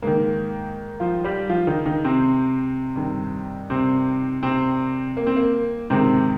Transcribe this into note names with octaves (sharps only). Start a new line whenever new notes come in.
G#2 D#3 A#3
F3 F4
G3 G4
F3 F4
D#3 D#4
D#3 D#4
C3 C4
G2 D#3
C3 C4
C3 C4
A#3
C4
A#3
G#2 C3 D#3 C4